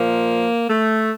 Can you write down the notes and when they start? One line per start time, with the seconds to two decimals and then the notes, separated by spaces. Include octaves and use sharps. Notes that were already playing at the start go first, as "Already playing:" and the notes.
Already playing: A#2 F3 A#3
0.70 A3